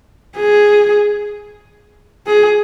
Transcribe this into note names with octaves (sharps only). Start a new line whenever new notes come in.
G#4
G#4